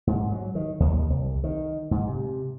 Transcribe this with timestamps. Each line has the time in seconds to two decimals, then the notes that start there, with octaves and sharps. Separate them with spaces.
0.07 G#2
0.32 F#3
0.55 D#3
0.80 D#2
1.10 C2
1.44 D#3
1.91 G#2
2.07 C3